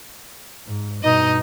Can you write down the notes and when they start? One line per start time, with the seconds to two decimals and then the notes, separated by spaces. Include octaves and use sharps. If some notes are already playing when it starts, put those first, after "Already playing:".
0.67 G#2
1.03 G2 B2 D#4 D#5